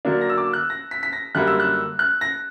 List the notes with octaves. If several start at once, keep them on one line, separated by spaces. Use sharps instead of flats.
D3 F#3 A#3 D4
A#6
E6
D6
F#6
A#6
B6
B6
A#6
F#2 D3 G3 A#3 F#6
E6
F#6
F#6
A#6